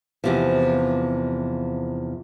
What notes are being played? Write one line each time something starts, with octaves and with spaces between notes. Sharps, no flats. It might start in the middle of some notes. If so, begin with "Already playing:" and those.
E2 C3 F3